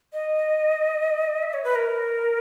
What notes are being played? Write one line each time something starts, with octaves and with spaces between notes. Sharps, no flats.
D#5
E5
C#5
B4
A#4